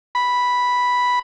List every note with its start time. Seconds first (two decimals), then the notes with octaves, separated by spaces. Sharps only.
0.15 B5